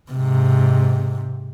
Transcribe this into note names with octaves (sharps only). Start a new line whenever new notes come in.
G#2 C3